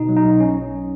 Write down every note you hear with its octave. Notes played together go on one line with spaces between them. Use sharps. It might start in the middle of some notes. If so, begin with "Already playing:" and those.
Already playing: B2 D#4
F#3
D#4
B1
C#4